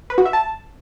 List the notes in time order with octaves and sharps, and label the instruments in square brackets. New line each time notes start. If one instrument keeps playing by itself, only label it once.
[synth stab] B4
F#4
E5
A5